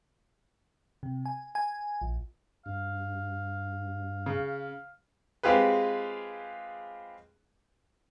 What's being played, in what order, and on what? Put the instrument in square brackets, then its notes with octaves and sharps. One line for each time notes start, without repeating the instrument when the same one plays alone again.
[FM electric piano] C3
G#5
G#5
A#1
[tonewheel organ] G2 [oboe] F5
[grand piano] C#3
[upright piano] G#3 C4 F4 G4 G#4 B4